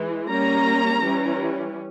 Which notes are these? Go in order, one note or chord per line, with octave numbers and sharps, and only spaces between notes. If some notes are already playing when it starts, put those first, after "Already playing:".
Already playing: E3 G#3
G3 A#3 C#4 A#5
E3 G3 C#4